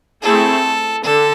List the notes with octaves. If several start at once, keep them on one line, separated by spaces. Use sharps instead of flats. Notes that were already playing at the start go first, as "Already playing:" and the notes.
A3 C4 E4 G#4 A4
D3 A4